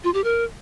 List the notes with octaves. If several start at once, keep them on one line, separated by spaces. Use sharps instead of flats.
F4
G4
A#4